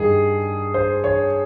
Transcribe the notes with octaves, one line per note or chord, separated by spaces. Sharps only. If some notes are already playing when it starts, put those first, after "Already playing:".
Already playing: G2 D#3 G#4
C5
C#5